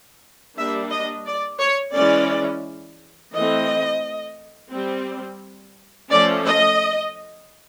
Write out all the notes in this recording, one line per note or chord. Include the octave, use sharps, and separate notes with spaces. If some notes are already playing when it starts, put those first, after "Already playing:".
G3 A#3 D4 E5
D#5
D5
C#5
E3 G#3 C#4 D5
E3 A3 C4 D#5
G3 C4
F3 A3 C#4 D5
D#5